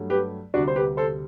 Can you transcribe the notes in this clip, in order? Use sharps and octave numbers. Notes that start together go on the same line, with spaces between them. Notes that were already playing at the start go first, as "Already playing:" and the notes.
Already playing: G2 F#3 A3
G4 B4
D2 C3 G3 D4 F#4
C5
G4 B4
A4 C5